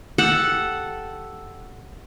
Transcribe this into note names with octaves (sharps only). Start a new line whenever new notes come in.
G4 A4 F#5